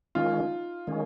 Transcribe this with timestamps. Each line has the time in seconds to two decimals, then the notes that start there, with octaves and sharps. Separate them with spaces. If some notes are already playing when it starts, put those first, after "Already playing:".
0.15 D#3 G#3 C#4 D#4 F4
0.87 D#3 G#3 C#4